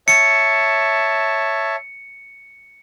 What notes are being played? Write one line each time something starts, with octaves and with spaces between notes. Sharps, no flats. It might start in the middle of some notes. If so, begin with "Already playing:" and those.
C#5 E5 A5 C#7